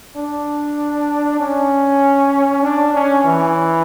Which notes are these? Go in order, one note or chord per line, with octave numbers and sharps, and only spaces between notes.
D4
C#4
D4
C#4
E3